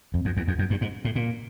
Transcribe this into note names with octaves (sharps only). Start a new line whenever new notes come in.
F2
F2
E2
F2
F#2
G2
G#2
A2
A#2